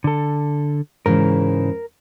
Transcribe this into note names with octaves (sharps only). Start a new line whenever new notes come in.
D3 A4
G#2 C#3 E3 A#4